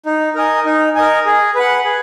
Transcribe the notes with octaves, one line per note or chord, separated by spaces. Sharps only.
D#4
A#4 D#5 G#5
D#4
A#4 D#5 G#5
G#4
B4 F#5
G#4